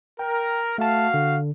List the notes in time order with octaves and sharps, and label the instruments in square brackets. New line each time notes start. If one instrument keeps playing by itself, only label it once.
[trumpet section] A#4 [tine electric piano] G5
[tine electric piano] A3 A5 [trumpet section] F#4 F5
[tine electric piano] D3